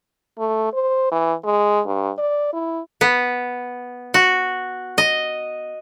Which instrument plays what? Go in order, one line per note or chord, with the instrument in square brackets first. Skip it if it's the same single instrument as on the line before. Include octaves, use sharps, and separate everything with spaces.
[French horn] A3
C5
E3
G#3
G2
D5
E4
[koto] B3
F#4
D#5